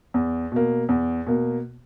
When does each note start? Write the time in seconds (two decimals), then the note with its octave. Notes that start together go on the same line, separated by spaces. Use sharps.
0.14 E2
0.52 B2 A#3
0.89 E2
1.27 B2 A#3